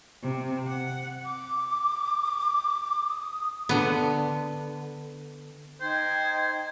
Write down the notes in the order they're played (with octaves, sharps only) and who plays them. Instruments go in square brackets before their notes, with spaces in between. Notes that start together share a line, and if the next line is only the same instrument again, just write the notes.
[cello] C3
F#5
[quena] D6
D#6
[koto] D3 B3
[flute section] D#4 G5 G#6 [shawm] C5